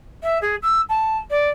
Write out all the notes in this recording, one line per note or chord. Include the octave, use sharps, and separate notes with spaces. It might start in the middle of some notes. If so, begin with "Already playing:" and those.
E5
G#4
E6
A5
D5